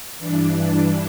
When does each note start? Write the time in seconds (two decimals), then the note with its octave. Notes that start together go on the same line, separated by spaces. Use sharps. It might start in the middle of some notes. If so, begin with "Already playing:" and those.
0.19 G2 E3 D4
0.58 D4